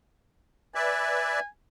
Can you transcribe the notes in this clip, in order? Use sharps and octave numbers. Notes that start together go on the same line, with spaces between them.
B4 D5 E5 G#5